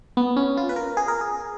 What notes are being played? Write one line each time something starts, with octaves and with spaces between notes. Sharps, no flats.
B3
C#4
F4
B4
A#4
G#4
A#4
G#4